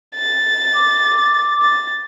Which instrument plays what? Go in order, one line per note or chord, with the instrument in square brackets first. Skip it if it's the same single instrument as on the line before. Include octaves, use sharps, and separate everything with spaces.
[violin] A6
[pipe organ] D6
[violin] A6